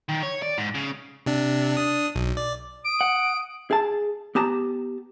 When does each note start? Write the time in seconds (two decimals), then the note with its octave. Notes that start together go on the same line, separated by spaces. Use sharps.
0.09 D#3
0.23 C#5
0.43 D5
0.58 G#2
0.75 C#3
1.26 C3 D4
1.77 D4 D#6
2.15 B1
2.37 D5
2.85 D#6 D7
3.01 F#5
3.71 G#4 A5
4.35 B3 G4 A5 A#5